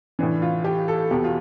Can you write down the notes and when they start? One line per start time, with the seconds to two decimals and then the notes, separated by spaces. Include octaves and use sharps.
0.19 A2 E3 D4
0.42 F4
0.64 G4
0.88 A4
1.11 E2 B2 G4
1.24 F4